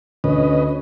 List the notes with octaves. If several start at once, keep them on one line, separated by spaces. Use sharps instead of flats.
D2 C#4 B4 D#5